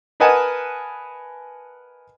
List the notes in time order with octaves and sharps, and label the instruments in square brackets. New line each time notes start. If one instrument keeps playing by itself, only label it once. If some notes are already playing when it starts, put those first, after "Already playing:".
[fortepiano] A#4 B4 D#5 F#5 G#5 A5